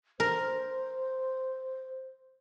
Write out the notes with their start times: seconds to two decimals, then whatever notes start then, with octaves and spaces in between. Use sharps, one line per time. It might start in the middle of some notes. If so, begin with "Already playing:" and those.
0.20 A#4 C5